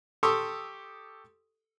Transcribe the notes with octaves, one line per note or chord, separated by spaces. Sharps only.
G4 A4 C6 C#6 D#6 E6